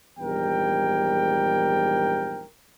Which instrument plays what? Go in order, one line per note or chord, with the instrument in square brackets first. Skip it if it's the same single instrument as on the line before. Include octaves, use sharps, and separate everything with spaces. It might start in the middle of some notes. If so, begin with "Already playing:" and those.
[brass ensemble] A#1 E2 G#2 G3 A#4 G5